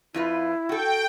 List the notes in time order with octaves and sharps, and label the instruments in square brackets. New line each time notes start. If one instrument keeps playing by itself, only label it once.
[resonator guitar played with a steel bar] F2 F4 B4 [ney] E4
[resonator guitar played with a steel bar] F#4 A4 [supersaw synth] G5